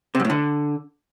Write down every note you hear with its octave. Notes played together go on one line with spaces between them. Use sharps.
C3
F#2
A2
D3